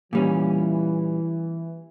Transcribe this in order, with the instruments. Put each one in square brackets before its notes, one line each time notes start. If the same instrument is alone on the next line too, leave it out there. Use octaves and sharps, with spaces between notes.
[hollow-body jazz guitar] A#2 G3 C#4 [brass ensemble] E3